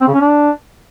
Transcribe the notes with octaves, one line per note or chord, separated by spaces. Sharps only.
C4
C#3
C#4
D4